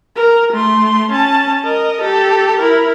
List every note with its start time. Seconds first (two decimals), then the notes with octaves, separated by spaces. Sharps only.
0.16 A#4
0.53 A3 C6
1.12 C#4 A5
1.65 A#4 D#5
2.01 G4 A4
2.60 E4 A#4